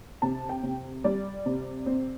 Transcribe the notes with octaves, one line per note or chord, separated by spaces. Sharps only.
C3 A5
G5
C3
G3 D5
C3
C4